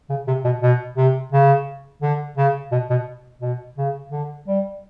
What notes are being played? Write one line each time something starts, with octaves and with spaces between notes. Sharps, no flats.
C#3
C3
B2
B2
C3
C#3
D3
C#3
B2
B2
B2
C#3
D3
G3